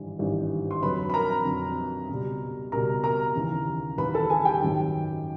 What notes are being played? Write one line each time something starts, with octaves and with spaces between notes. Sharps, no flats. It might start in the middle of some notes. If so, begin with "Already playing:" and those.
Already playing: G#1 G2 E3 G3
G#1 G2 E3 G3
C6
F2 D3 F#3 B4 B5
B5
A#4 A#5
F2 D3 F#3
C#2 B2 G3
C#2 B2 G3 A#4 A#5
A#4 A#5
D#2 C#3 E3
D#2 C#3 E3 B4 B5
A4 A5
G#4 G#5
G4 G5
G#1 F#2 D#3 F#3